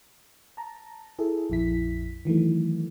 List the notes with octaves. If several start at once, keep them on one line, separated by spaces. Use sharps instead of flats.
A5 A#5
E4 G#4 A4
A#1 F2 E4 B6
D#3 E3 F#3 A3